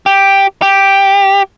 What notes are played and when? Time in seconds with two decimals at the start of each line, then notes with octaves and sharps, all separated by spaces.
0.06 G4
0.62 G4